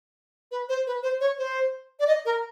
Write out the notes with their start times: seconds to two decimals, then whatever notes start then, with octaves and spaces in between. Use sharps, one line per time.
0.51 B4
0.69 C5
0.87 B4
1.03 C5
1.20 C#5
1.38 C5
2.00 D5
2.07 D#5
2.25 A#4